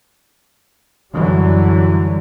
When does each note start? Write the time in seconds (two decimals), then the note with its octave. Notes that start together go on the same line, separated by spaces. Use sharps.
1.13 F#2 D3 E3 F#3 G3